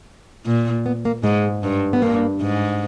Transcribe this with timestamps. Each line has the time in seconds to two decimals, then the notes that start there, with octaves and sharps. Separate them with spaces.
0.46 A#2
0.86 B3
1.05 A#3
1.24 G#2 G#3
1.63 G2
1.93 B3
2.02 G2 A#3
2.41 G#2